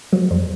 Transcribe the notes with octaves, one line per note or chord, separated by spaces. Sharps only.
F#3
F2